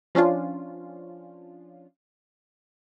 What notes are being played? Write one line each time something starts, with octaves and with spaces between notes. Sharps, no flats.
F3 C#4 D4 F4